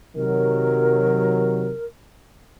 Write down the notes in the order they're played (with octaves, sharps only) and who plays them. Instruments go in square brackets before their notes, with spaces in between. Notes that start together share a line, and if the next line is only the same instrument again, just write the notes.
[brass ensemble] C3 D#3 F#3 [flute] A#4